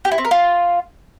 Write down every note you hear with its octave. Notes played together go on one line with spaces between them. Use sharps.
G4
E4
C4
A#4
F4